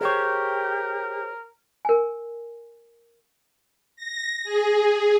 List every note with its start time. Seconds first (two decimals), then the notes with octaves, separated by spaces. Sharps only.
0.01 G4 G#4 A#4 C5 C#5
1.85 A#4 G#5
3.96 A#6
4.44 G#4